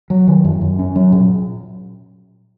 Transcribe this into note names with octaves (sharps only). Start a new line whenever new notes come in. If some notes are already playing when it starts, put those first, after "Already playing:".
F#3
D#3
F#2
F#2
C#4
F#3
A#2